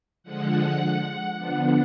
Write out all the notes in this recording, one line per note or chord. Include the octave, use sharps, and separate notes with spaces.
D3 F3 G#3 F#5
D3 F3 B3 D4 F#5